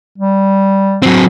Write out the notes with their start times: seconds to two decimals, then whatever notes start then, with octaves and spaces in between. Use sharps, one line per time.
0.18 G3
1.02 F#3 C4